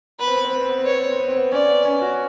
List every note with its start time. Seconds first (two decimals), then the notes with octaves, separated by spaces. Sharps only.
0.19 B3 B4
0.27 C4
0.36 B3
0.45 C4
0.53 B3
0.61 C4
0.69 B3
0.78 C4
0.85 B3 C#5
0.95 C4
1.03 B3
1.12 C4
1.20 B3
1.28 C4
1.37 B3
1.52 C#4 D5
1.69 B3
1.85 C#4
2.02 F#4